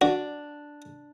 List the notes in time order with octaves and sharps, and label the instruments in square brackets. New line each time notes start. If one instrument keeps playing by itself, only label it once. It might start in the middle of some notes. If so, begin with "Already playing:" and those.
[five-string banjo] D4 [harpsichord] F#4